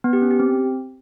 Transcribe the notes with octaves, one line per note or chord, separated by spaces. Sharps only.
B3
G4
C#4
G4
C4